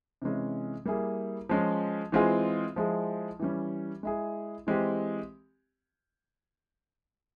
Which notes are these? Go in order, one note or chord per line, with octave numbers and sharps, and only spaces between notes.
C3 E3 G#3 C#4
G3 A#3 E4 G#4
F3 G#3 C#4
E3 G#3 C4 F4 G#4
F3 G#3 E4 G#4
E3 G3 C#4
G#3 E4 G#4
E3 G#3 C4 G4